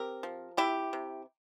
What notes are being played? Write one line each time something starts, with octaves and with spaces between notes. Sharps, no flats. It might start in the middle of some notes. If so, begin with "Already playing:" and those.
Already playing: C4 G4 A#4
F3
C3 E4 G4
C3